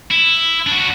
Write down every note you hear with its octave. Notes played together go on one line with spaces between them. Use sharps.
E4
D4 F#4